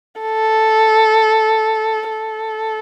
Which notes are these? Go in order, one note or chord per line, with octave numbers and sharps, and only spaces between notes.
A4
A4